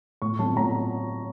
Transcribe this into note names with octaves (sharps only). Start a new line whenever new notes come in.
A2 C#6
F#3 A3 C4 A5
A2 A#5